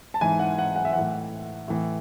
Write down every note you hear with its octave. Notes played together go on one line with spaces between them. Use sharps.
A5
G#2 E3 G#5
F#5
F#5
F#5
E5
A2 E3 F#5
A2 E3